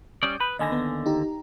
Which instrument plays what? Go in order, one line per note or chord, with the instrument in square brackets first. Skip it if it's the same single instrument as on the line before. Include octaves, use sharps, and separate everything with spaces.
[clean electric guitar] G3 C#4 D5 [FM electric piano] D#6 G6
[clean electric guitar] B4 [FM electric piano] B5
[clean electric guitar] D#2 D3 [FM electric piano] D#5 G#5 A#6
[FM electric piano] B3
D#4 G4 A#5